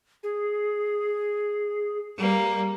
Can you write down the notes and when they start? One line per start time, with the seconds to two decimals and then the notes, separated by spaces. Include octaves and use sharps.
0.23 G#4
2.17 G3 A#3